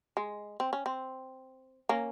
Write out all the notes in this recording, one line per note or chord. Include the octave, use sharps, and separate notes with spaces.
G#3
C4
C#4
C4
A#3 C#4